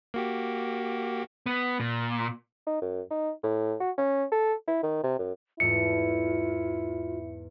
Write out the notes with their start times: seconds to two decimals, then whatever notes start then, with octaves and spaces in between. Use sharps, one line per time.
0.14 A#3 F#4 G4
1.46 B3
1.80 A#2
2.67 D#4
2.82 F#2
3.11 D#4
3.44 A2
3.80 F#4
3.98 C#4
4.32 A4
4.68 E4
4.83 D#3
5.03 C3
5.19 F#2
5.60 E2 G#2 A3 E4 F4 C#7